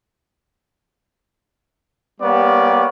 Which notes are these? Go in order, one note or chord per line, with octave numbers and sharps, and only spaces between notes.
G3 A#3 B3 G4 C#5 D5